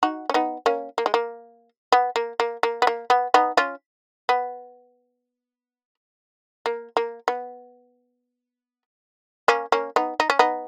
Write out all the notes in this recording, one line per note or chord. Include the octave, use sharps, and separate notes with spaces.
D#4 F#4
C#4
B3 D#4
A#3 C#4
A#3
G#3
A#3
B3
A#3
A#3
A#3
B3
A#3
B3
B3 D#4
C#4 F4
B3
A#3
A#3
B3
A#3 C#4
A#3 C#4
B3 D#4
D#4
C#4
B3 D#4